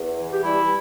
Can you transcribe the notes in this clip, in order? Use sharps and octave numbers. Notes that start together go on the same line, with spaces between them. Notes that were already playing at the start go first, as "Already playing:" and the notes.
Already playing: E2
E3
G4
G3 E4